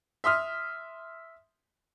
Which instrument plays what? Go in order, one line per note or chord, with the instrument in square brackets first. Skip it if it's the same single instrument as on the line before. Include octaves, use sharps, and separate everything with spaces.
[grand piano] E5 C6 D#6 F6